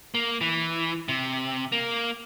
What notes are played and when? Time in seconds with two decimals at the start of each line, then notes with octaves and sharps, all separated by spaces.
0.14 A#3
0.41 E3
1.09 C3
1.72 A#3